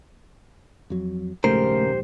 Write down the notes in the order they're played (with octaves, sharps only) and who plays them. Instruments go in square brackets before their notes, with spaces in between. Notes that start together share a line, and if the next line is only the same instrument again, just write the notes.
[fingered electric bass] F2 F#3
[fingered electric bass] D#1 A#1 G#2 [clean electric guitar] C#3 A#4 [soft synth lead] A3 [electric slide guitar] G4 C5